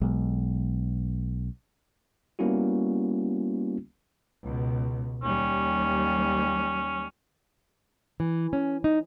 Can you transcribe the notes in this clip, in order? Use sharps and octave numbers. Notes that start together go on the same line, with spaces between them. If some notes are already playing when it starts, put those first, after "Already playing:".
B1 G#3
G3 A#3 B3 C#4 E4 F#4
C#2 B2
D#2 G3 C#4
E3
C#4
D#4